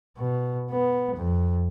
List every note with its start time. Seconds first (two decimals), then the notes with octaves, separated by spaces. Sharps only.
0.18 B2
0.71 B3
1.16 F2